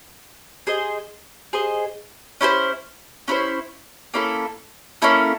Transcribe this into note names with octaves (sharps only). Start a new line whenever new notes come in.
G#4 C5 D#5
G#4 C5 D#5
C#4 E4 A4 C5
C#4 E4 A4 C5
A#3 C#4 E4 A4
A#3 C#4 E4 A4